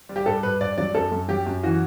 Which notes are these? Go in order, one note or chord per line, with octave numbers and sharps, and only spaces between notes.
G3
G4
G2 A4
G2 B4
G2 D5
F#3 D5
F#2 A4
F#2
F#3 G4
F#2
E3 F#4